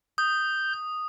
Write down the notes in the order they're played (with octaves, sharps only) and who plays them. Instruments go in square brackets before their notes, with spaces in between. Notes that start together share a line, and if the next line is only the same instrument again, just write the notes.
[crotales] D#6 [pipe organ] G6